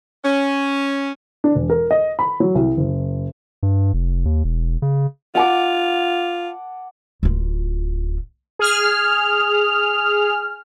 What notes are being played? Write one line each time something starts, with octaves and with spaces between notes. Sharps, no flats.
C#4
D4
E1
A#4
D#5
B5
F#3
C2
F#1
G2
F1
D#2
E1
C#3
F4 F#5 A5 D6
D1 F4
G#4 F6